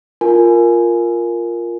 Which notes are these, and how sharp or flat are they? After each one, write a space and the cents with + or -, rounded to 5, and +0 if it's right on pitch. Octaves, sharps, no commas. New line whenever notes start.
F4 +0 A#4 +0 G#5 +10